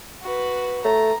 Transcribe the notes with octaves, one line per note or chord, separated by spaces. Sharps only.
F#4 B4
A3 A#5